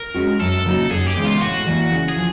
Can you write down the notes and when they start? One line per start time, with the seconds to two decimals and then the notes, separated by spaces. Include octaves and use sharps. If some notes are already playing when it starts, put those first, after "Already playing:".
Already playing: A#4
0.14 G#3 C#4 F#4
0.40 F#2 A4
0.66 C#3 F#3 A#3 D#4
0.91 F#2 G#4
1.07 G4
1.16 C#3 E3 G#3 B3
1.24 F4
1.41 A2 F#4
1.66 E3 G3 A#3
1.92 C#3
2.08 G#4
2.16 F3